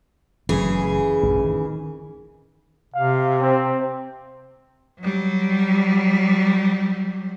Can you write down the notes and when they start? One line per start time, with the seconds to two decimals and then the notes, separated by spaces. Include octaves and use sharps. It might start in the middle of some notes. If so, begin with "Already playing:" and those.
0.49 F#1 C#3 E3 F#3 A3 G#4
1.23 A1 F#2
1.41 D#3
2.94 C3 F5
3.41 C4
5.00 F#3 G3